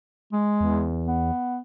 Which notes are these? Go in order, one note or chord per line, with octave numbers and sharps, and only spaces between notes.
G#3
E2
B3